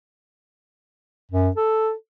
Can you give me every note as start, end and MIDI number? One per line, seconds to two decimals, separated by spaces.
1.32 1.49 42
1.56 1.93 69